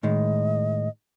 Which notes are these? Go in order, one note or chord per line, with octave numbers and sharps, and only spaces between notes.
A2 D#3 G#3 D#5